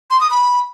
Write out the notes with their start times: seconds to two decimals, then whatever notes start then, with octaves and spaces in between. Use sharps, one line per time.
0.11 C6
0.21 D#6
0.31 B5